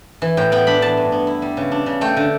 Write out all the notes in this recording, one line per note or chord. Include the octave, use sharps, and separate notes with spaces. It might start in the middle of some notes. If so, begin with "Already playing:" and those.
E3
A2 G5
B3 G5
D4 B5
E3 A5
G2
B3
E4
G3
C#3
D4
C#3
A3 G5
D3